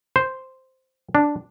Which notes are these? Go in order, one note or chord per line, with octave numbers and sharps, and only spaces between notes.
C5
D4